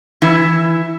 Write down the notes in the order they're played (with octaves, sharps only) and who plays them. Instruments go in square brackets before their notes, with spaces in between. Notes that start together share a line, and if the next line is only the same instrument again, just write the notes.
[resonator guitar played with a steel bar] E3 E4